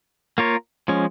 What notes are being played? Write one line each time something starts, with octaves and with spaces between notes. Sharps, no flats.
A#3 F4 A#4 C#5
F3 G#3 C#4